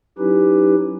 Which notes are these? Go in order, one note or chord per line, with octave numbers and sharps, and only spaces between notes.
F#3 C#4 D#4 E4 G4 B4